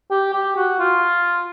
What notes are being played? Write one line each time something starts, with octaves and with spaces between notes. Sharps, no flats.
G4
G4
F#4
F4